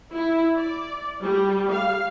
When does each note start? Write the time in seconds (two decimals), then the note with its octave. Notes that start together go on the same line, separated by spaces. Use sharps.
0.14 E4
0.55 D5
1.23 G3
1.70 F5